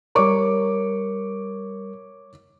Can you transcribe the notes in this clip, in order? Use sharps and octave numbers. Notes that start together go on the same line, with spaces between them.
G3 A#4 C#5 C#6 D6